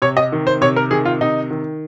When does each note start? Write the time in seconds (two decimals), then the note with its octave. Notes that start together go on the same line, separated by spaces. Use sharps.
0.02 C3 C#5
0.17 D#5
0.32 D#3
0.47 C5
0.61 C3 C#5
0.76 A#4
0.91 D#3 G#4
1.05 F4
1.21 C3 D#4
1.51 D#3